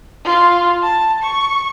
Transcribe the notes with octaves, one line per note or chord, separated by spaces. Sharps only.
F4
A5
C#6